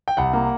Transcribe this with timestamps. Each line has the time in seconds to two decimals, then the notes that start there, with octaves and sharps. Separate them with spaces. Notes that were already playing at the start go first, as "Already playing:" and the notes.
0.08 G5
0.17 C2 F#5
0.33 A#3